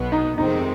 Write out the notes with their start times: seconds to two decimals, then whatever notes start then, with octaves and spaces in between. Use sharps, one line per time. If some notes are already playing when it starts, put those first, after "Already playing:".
Already playing: B1 B2 B3
0.12 D#4
0.38 F2 C3 D#3 G#3 C4 D#4